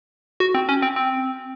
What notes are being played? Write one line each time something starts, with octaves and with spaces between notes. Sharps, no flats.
F#4
C4
C#4
C4
C4